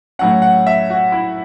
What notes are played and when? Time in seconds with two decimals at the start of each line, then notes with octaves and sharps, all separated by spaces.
0.19 A2 F#3 C#4 F#5
0.42 F#5
0.67 E5
0.90 F#4
1.12 E4